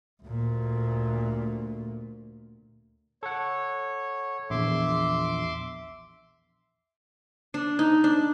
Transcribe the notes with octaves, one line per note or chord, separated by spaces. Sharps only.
D2 A#2
A4 C#5 F#5
A#1 E2 E5 C6 D6
D4
D#4
D4